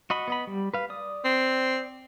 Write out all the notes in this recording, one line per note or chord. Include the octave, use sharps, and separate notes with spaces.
F#4 D#5 B5
B3 D#5 B5
G3
B4 F5
D5 D#6
C4